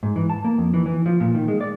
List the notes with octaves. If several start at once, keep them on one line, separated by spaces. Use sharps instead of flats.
G#2
E3
A5
A#3
F2
E3
E3
F3
A#2
D#3
G#3
D5